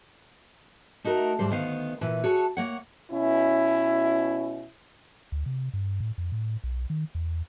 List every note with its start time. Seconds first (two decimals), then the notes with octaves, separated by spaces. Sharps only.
1.04 A3 D#4 F#4 A#4
1.39 D#2 G#2 G3 C5
1.50 D2 D#3 B3 C5 F5
2.01 A#2 E3 B4
2.24 F#4 G#4 A4 C#5
2.57 A#3 C#5 F#5
3.11 B2 C#4 E4
5.32 D2
5.46 C3
5.74 G2
6.00 A2
6.18 F2
6.32 A2
6.64 B1
6.90 D#3
7.15 E2